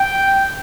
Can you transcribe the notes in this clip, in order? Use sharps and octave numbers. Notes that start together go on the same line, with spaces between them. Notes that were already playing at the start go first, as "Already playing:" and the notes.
Already playing: G5